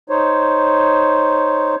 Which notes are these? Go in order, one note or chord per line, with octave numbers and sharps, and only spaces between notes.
D#4 C5 C#5